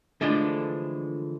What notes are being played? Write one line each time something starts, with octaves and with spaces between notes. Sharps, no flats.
D3 E3 F3 G#3 A3 D4